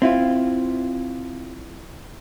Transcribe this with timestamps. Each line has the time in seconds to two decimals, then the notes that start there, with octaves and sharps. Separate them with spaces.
0.02 C4 E4 F4